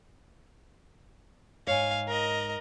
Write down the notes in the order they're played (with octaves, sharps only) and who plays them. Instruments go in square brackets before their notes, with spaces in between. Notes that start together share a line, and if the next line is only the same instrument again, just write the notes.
[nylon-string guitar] G#2 C#5 [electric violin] F5 G#5
[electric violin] A#4 D#5